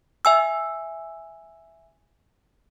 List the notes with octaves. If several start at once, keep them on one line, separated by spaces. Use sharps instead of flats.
E5 G#5 E6